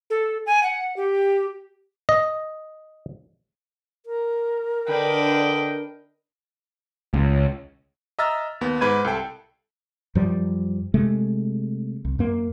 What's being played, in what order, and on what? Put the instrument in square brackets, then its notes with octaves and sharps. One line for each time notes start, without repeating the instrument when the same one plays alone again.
[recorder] A4
G#5
F#5
G4
[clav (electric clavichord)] D#5
[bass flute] A#4
[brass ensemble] D3 D#5 G5 [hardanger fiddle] D4 B4
[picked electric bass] C#2
[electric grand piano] D#5 E5 A#5 E6 F6 A6
D#2 B3
G#2 B4 B5 G#6 D#7
C2 A4 G5
[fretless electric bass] F#2 F3 G3
C3 G#3 A3
C2
F#2 A#3